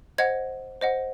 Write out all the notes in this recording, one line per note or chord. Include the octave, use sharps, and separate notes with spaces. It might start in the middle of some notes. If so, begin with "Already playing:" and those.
C5 D#5 F#5 G#6
C5 D#5 F#5